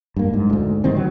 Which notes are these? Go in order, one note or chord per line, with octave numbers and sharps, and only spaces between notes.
G2 A#3
G#2
D2 G#2
D1 D#3 G3 C4
F#3